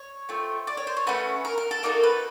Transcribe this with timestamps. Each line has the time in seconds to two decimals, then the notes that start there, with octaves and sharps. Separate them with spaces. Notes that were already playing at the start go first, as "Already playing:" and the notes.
Already playing: C#5
0.29 A3 C4 F4
0.67 D5
0.77 C#5
0.87 C5
0.97 C#5
1.07 A3 C#4 F#4 B4
1.45 A#4
1.58 A#4
1.71 A4
1.83 A#3 D#4 F#4 A4 A#4
2.03 B4